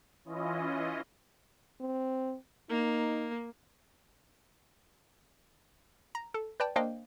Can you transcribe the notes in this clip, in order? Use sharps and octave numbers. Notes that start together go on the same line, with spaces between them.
E3 C#4 E4 F4 D#5
C4
A#3 D#4
A#5
A4
B4 D5 G5 A5
A#3 D4 C5 D#5 F5 G5